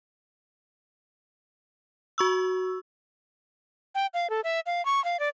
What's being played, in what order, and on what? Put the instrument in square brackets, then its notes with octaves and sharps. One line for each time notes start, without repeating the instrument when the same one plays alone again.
[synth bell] F#4 C#6 E6
[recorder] G5
F5
A4
E5
F5
C#6
F5
D5